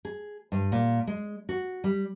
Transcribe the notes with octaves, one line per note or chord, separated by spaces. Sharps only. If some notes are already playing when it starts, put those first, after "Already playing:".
G#4
G2
A#2
G#3
F#4
G3